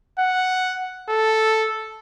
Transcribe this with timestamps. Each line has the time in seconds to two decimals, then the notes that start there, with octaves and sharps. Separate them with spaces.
0.19 F#5
1.09 A4